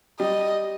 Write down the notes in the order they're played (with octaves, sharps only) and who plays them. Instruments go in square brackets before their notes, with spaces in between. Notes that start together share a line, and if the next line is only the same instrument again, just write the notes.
[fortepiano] G3 [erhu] D#5